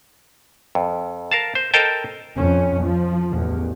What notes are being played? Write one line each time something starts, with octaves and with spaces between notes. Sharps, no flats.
F2
A#4 F5 A5
C5
A4 A#4 C5 D#5 G5 A5
F2 C#4
F3
A1 E2